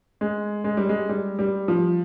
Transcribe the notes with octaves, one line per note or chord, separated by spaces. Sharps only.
G#3
G#3
G3
G#3
G3
G3
F3